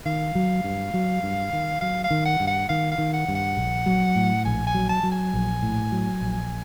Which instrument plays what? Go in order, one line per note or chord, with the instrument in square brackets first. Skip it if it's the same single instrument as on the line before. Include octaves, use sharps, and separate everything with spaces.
[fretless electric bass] D#3 [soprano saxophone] F5
[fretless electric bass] F#3
G2
F#3
G2
D#3
[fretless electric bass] F#3 [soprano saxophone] F5
[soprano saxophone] F5
[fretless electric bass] D#3
[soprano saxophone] F#5
[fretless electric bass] G2
[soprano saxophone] F#5
[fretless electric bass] D#3 [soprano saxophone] F5
[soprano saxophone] F5
[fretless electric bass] D#3
[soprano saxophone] F#5
[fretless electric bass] G2
[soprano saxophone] F#5
[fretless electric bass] A#1
F#3
A2
[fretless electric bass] A#1 [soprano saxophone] G#5
[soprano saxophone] G#5
[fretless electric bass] F#3
[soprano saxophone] A5
[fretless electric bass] F#3
[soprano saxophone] G#5
[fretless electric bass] A#1
A2
F#3
A#1